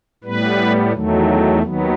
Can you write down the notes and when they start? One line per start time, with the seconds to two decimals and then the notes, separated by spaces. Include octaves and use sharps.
0.24 A2 G3 B3 B4
0.93 E2 D#3 F#3 A3
1.62 D#2 D#3 F#3 B3